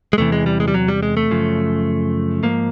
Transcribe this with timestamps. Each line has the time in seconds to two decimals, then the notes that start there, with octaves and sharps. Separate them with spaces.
0.13 G#3
0.18 E2 C3 E3 A3
0.32 G#3
0.46 G3
0.60 G#3
0.68 G3
0.74 F#3
0.88 G3
1.03 G#3
1.17 A3
1.30 F#2 C#3 F3
2.43 G#2 F3 A#3